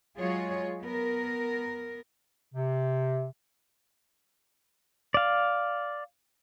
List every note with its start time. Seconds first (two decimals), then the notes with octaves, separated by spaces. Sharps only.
0.19 F#3 G#3 F4 G#4 C#5
0.80 B3 A#4
2.54 C3
5.14 D5 F5